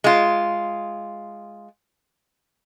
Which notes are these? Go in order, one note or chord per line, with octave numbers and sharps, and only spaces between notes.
G#3 F4